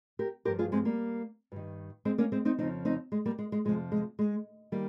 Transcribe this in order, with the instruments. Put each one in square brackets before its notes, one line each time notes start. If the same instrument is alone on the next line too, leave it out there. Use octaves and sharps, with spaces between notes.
[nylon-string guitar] G4 A#4
G2 F3 G4 A#4
F4 G#4
G#3 C4
G3 A#3
G2 D#3
G#3 C4
A#3 C#4
G#3 C4
C4 D#4
F2 C#3 F3 C4 D#4
C4 D#4
G#3
G3 A#3
G#3
G#3
F2 C3 F3 G#3
G#3
G#3
D#3 G3 A#3